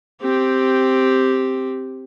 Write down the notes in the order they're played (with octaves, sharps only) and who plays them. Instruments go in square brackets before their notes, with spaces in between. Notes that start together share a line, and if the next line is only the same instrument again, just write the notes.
[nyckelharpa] C4 G4